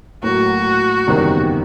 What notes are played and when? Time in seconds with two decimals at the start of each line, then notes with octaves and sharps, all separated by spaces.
0.23 A2 F#3 A#3 F#4
1.07 F#1 E2 C3 D#3 G3